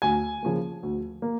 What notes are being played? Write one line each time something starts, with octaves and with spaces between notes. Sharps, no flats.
D2 G#5
C#3 F3 A#3
D2
A#3